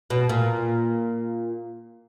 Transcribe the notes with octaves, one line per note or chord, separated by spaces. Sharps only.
B2
A#2